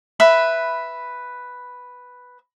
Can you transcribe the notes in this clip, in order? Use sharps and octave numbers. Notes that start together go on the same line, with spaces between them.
B4 E5 B5